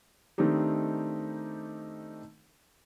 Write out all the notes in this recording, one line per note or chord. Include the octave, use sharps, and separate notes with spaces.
D#3 A3 C4 D4 D#4 G4